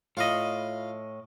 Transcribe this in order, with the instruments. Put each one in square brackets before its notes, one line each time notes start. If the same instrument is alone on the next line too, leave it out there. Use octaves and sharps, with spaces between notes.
[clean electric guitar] A2 D#5 [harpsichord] F4 F5 B5